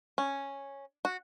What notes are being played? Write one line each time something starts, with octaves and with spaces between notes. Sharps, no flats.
C#4
F#4